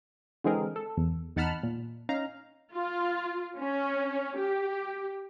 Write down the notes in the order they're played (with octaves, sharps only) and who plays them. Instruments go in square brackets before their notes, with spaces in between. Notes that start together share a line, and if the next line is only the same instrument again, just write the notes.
[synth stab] D3 E3 G#3 C4 G#4 A#4
A4
E2
E2 D#4 F#5 A5 B5 F6
A#2
C#4 D#4 F5 A#5
[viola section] F4
C#4
G4